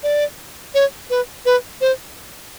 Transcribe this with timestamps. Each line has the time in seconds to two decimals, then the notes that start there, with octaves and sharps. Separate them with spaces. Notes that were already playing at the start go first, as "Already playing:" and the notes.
0.03 D5
0.74 C#5
1.10 B4
1.45 B4
1.81 C5